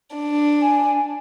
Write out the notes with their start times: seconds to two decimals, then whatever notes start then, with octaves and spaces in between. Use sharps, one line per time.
0.16 D4
0.61 G#5